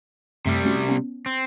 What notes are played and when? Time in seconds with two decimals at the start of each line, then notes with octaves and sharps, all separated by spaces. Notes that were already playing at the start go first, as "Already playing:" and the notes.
0.46 F#2 C3 G3 A3 C6
0.65 A3 C#4 F#4
0.89 B3 C#4
1.26 C4